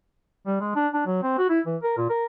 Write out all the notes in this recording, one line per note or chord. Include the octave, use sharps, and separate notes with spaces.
G3
G#3
D4
D4
F#3
C4
F#4
E4
E3
A#4
A#2
A#4